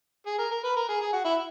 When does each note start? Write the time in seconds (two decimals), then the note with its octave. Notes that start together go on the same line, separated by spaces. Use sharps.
0.26 G#4
0.38 A#4
0.51 A#4
0.64 B4
0.76 A#4
0.89 G#4
1.01 G#4
1.13 F#4
1.25 E4